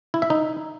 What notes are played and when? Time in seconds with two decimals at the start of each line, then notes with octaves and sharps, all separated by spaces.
0.14 E4
0.22 E5
0.30 D#4